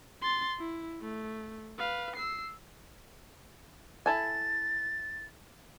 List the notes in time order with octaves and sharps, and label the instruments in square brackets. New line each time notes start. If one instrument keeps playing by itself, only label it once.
[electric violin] C6 A6
E4
A3
B4 F5
E6 C7
[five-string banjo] E4 A4 G#5 [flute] A6